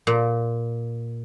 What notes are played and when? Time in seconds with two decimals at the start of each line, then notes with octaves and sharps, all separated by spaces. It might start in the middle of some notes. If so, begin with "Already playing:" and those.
0.07 A#2